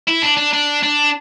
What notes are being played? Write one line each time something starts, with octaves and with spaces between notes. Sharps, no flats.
E4
D4
D4
D4
D4